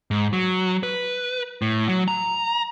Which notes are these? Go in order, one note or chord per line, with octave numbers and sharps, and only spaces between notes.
G#2
F#3
B4
A2
F#3
A#5